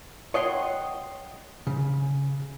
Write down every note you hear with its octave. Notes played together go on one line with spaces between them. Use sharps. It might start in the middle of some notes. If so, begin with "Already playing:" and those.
C#5 D#5 F#5 G5 C6
C#3